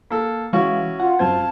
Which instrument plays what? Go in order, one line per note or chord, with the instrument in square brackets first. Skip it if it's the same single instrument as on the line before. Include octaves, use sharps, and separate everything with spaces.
[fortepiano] A#3 A4
[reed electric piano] E3 G#3 F5 [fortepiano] C#4 E4 F#4
[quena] F4 [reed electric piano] F#5
[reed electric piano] F#2 C4 G#6 [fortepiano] F4 C5 [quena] A5